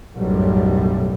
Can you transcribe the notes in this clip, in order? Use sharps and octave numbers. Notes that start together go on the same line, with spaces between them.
B1 F#2 A2 G3